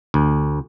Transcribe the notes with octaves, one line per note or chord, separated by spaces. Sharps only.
D2